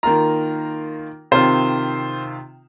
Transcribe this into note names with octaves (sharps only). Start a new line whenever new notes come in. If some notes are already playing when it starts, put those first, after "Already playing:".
D#3 A#3 F4 A#5
C3 D#3 C4 F4 C5